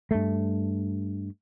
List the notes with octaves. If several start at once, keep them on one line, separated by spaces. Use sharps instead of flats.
G2 A3